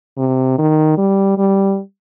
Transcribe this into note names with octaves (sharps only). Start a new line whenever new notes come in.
C3
D#3
G3
G3